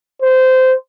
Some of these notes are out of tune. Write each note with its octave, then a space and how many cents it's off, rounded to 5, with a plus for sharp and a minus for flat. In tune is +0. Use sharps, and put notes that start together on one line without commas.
C5 -15